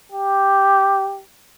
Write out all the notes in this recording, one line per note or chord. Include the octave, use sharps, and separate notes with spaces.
G4